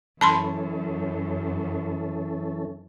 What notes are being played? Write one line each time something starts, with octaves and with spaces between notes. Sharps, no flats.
F#2 E3 C#4 A4 A5 B5 C6